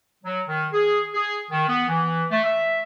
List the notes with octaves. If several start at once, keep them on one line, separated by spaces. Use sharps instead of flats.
F#3
D#3
G#4
G#4
D#3
B3
E3
A3
E5